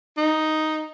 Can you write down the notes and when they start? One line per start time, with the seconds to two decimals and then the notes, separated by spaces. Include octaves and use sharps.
0.17 D#4